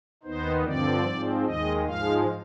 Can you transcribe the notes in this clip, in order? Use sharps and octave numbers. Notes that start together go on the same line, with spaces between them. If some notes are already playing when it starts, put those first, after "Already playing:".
D#2 D#3 B3 D#4 C5
G2 D3 F3 C4 D5
G#2 F3 C4
D#2 D#3 G#3 D#5
G#2 F3 G#3 F5